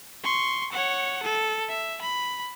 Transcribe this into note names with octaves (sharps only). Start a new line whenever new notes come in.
C6 C#6
C#5 F#5
A4
E5
B5